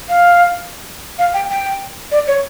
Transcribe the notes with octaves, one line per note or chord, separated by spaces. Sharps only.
F5
F5
G5
G5
D5
C#5